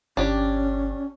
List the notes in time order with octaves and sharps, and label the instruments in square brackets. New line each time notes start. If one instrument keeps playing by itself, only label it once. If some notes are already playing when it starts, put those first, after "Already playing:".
[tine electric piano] G1 [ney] C#4 [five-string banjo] D4 G4 C#5